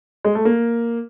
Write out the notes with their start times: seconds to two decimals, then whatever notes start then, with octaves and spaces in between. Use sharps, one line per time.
0.25 G#3
0.35 A3
0.45 A#3